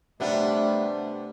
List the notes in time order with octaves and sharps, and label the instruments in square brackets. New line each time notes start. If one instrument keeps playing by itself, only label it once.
[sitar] C3 B3 D4 [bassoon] G3 [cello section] A3 [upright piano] E5